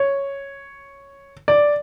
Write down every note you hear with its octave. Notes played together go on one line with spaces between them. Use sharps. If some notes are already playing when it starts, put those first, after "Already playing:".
Already playing: C#5
D5